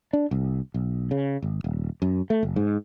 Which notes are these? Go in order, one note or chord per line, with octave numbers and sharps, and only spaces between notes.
D4
C2
B1
C#3
G#1
D#1
F#2
A3
F#1
G#2